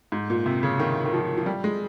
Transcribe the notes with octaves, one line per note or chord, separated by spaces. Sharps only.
G#2
A#2
C3
C#3
D#3
D#3
F3
F3
G3
G#3